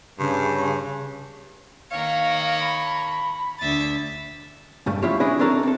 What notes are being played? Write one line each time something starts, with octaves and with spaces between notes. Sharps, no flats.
G2 C#3
D#3 A#3 C#5 F5
B5
D2 E5 A6
C#2 G2 G3 A3
F3 C#4 E4 F4 G4 C#5
C#4 D4 E4 G#4 D#5 B5
C4 D4 D#4 A4 A#4 C#5
C4 A4